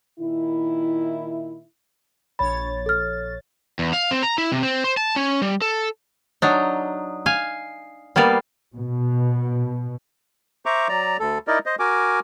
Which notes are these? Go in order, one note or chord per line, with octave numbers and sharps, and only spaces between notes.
A#2 D#3 D#4 E4
A#1 C#5 B5 A6
A4 F6
E2
F5
C4
A#5
E4
C3
C4
C5
A5
C#4
G3
A4
F#3 D4 D#4
F5 G#5
G3 A#3 B3 D5 F5
B2
C5 E5 A#5 C#6 D6
F#3 D5 A#5
D2 A4
D#4 E4 A#4 D5 D#5
C5 D#5
F#4 A#4 G#5 D6